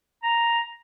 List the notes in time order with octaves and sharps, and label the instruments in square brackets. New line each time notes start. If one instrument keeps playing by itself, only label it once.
[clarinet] A#5